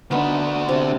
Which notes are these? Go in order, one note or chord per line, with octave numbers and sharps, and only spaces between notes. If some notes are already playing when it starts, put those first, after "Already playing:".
D2 B3 D4 D#4
C3